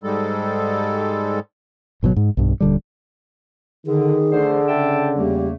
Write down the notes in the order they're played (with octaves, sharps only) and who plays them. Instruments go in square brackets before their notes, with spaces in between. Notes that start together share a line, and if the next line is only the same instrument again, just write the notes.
[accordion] G#2 G3 G#3 A4
[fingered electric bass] G#1 B2 D3 F#3
G#2
B1 G2
D#1 D3 G3
[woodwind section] D3 [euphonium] D#3 [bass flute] G#4
[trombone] D3 [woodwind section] E3 A3 C5
[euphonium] C#3 [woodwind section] E5 G5 A5
[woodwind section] E2 A3 A#3 [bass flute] G3